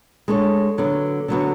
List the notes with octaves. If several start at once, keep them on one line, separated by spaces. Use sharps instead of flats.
G#3 D4 A4 C#5
D3 F#3 B3 F#4
D3 F#3 B3 F#4